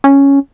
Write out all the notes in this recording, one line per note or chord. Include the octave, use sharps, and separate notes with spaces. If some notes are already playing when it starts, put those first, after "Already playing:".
C#4